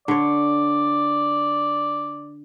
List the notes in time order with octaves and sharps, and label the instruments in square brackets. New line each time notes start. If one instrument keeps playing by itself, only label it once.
[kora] D3 C#5 [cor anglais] D5